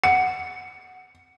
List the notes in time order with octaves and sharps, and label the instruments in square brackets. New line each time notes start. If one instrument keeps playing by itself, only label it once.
[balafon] F#5 [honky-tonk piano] C#7